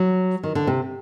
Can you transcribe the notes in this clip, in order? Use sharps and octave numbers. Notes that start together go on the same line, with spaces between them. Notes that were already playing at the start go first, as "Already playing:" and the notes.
Already playing: F#3
D#3
D3
C3